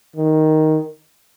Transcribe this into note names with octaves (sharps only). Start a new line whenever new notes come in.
D#3